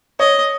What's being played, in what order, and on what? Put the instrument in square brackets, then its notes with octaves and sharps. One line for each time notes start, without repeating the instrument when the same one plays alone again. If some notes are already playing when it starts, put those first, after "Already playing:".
[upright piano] C#5 [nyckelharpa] D#5